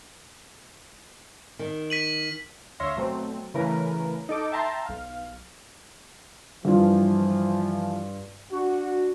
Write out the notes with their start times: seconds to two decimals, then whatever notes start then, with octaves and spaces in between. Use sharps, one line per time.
1.59 D#3
1.90 B6 D#7 F#7
2.80 D2 C#5 E5 F5 C6 A#6
2.97 B2 F#3 A3 C4
3.54 C#3 E3 A3 C#4 A#4 B4
4.29 D#4 A4 D6
4.51 E5 G5 A5 A#5 C6
4.86 B1 F5
6.65 G2 E3 F3 F4
8.52 D4 F#4